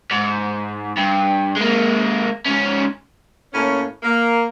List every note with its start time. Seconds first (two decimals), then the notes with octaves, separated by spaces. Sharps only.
0.11 G#2
0.98 G2
1.57 G#3 A#3
2.46 G#2 C#4
3.53 A2 A#3 C#4
4.03 A#3